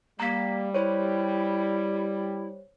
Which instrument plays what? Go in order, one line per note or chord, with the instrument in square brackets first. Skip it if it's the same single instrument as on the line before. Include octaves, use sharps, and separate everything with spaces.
[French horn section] G3 [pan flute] A#3 [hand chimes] A#5 B6
[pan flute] E4 [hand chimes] C5 C#5